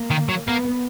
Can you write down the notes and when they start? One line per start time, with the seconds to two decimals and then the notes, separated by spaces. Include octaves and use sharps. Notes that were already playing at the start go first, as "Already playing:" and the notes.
Already playing: A#3
0.10 D#3
0.29 F#3
0.48 A#3 B3